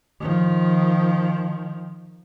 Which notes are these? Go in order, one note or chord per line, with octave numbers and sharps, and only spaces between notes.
D#3 F3